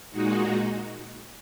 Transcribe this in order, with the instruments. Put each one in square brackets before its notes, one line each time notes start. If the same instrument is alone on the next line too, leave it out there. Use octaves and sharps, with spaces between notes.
[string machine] A#2 G#3 D#4 F#4